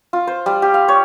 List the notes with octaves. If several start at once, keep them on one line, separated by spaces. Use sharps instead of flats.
F4
C5
G3
G4
F5
C#5